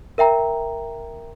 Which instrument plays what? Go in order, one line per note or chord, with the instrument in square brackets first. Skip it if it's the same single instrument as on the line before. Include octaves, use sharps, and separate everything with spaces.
[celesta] A#4 E5 G5 A#5